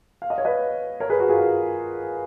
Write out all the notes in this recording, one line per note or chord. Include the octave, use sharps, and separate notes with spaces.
F5
D#5
C#5
B4 D#5
A#4 C#5
G#4 B4
F#4 A#4
F4 G#4